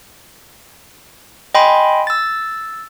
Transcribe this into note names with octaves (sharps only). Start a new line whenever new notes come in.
D#5 G5 G#5 B5 C6
E6 A6